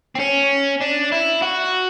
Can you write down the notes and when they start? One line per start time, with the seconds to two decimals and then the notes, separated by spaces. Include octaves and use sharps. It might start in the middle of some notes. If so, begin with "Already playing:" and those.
0.15 C4
0.20 C#4
0.81 D4
1.12 E4
1.42 F#4